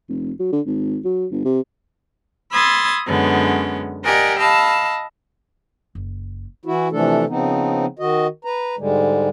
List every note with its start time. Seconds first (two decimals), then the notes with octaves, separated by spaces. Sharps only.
0.09 F1
0.40 F#3
0.53 D3
0.66 G#1
1.05 F#3
1.31 G1
1.45 C3
2.51 B5 C6 D#6 E6 G#6 A6
3.06 F#2 D3 G#3 B3 C#4
4.05 G4 A#4 D5 D#5 F#5 G#5
4.39 D#5 F5 A5 B5 E6
5.95 F#1
6.65 E3 E4 F#4
6.92 C3 E3 F3 A3 D4 A4
7.29 C#3 F3 B3 C4 D#4
7.99 D#3 F#4 D#5
8.45 B4 A#5
8.78 G#2 D3 G3 G#3